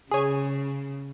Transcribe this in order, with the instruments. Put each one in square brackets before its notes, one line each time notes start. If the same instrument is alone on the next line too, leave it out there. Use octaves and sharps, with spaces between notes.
[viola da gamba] C#3 [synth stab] G#4 C#5